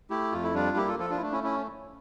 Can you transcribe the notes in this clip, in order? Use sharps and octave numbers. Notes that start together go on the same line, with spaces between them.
A3 E4 G4
F2 F4
E4
G3 D4 F4
A#3 E4 G4
F4 A4
F3 F4 A4
D4 F4
E4
A3 D4
C#4 E4
C#4 E4